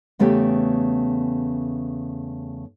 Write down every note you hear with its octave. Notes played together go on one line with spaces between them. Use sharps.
E2 C#3 A3 B3 G4 G5